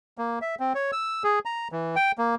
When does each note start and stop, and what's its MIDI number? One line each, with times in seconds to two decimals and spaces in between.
0.18 0.39 58
0.42 0.55 76
0.60 0.73 60
0.75 0.91 73
0.92 1.23 88
1.24 1.39 68
1.45 1.68 82
1.72 1.96 52
1.96 2.12 79
2.18 2.35 58